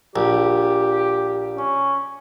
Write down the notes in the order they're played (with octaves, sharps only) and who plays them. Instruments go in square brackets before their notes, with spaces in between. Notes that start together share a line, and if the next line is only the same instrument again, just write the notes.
[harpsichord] A#1 [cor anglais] G4
[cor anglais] C#4